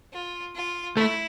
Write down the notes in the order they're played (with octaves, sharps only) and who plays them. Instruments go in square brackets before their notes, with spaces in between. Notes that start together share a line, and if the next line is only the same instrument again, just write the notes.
[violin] F4
F4
[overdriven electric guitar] A3 [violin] E4